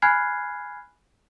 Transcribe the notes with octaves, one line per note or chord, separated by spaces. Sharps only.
G#5 B5 F6 F#6 G#6 C7